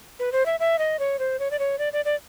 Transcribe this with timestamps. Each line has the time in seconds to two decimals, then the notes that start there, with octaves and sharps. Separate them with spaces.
0.19 B4
0.32 C5
0.46 E5
0.60 E5
0.79 D#5
0.99 C#5
1.19 C5
1.39 C#5
1.51 D5
1.59 C#5
1.79 D5
1.93 D5
2.05 D5